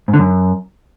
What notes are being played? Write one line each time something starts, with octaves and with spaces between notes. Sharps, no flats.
G#2
D3
F#2